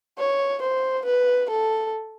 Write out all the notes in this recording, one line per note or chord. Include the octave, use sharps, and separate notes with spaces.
C#5
C5
B4
A4